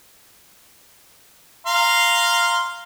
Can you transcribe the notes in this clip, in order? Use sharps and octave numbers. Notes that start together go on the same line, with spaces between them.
F5 A#5 C6